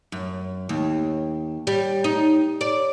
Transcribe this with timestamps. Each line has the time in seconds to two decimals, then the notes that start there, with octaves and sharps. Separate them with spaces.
0.12 F#2
0.69 D#2
1.67 G3
2.04 D#4
2.61 D5